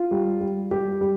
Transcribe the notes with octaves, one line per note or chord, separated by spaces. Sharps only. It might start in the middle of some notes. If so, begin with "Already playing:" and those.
Already playing: F4
G3
G3
G3 G4
G3